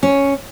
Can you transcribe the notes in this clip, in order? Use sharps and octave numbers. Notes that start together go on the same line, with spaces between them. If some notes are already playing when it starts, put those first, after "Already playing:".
C#4